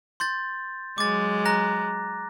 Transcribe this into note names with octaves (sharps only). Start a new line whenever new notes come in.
C6 G6 A6
F#3 G#3 D6 A6
A#5 F#6 A#6